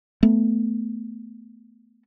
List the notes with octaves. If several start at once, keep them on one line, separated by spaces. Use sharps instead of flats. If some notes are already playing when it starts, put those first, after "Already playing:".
A3 B3